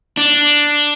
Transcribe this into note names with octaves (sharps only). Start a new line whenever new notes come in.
D4